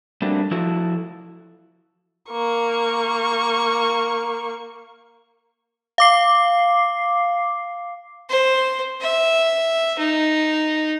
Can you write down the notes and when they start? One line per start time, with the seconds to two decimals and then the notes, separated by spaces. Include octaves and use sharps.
0.22 G3 A3 A#3 C4 D4 F#4
0.51 F3 E4 F#4 A4
2.31 A#3 C#6
5.98 F5 D6 C7
8.29 C5
9.02 E5
9.99 D#4